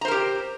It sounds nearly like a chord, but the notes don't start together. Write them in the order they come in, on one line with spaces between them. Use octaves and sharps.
A#5 C5 A#4 G4